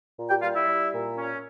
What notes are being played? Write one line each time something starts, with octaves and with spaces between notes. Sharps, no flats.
A#2
G4 G5
G3 F4 F5
E4 E5
G3
A#2
C#4